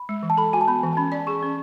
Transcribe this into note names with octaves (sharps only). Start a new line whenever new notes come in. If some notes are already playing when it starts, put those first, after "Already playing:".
Already playing: B5
G#3
E3
A5
A4 B5
F#4 G#5
A5
B3 B5
E3
A5
C#4 B5
D5
G#4 C#6
C#4